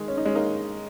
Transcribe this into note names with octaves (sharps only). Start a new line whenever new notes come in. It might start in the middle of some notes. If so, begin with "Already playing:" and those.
Already playing: D#3 G#3
C#4
D#4
G#3 C#4
A#3 D#4